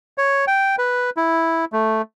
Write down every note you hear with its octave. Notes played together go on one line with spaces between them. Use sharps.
C#5
G5
B4
E4
A3